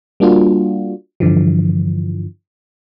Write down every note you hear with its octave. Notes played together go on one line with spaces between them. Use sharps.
G3 A#3 D4 F4 F#4
G2 D3 E3 F3